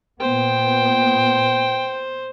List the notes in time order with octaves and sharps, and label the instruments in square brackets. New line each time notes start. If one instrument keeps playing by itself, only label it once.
[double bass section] A#2 B3 [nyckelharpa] C5 [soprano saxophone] G5